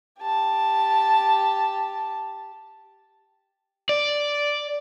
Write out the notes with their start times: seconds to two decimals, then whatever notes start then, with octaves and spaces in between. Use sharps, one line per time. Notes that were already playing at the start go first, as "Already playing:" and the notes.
0.21 G4 A5
3.89 D5